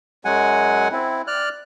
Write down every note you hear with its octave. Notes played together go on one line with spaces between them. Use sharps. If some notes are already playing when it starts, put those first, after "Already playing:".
F#2 F#3 G#3 F#5 G#5
C4 E4
D5 F6 F#6